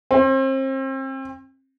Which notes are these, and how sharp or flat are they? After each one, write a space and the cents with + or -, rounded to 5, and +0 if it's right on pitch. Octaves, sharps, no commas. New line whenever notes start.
C4 +35